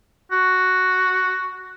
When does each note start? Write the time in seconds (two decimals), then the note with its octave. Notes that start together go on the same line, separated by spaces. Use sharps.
0.32 F#4